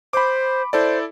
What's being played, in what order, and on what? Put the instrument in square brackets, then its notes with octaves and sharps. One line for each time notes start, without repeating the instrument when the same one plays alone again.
[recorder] C5 [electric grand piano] B5 D6
[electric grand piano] E4 A4 D5 [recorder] C5